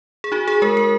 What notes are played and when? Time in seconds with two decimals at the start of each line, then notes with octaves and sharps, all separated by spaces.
0.24 G#4
0.32 D#4 F#4
0.47 G#4
0.62 G#3 A#4
0.77 A#4